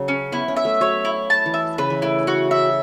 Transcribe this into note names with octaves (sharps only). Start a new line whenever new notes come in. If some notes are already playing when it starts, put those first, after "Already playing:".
Already playing: C#3 F#3
C#4
B3 E4
C#4
E5
A3
F#3 C#5
E4
A5
E3
E5
C#3 B4
E3
A3 E4
C#3 F#4
E5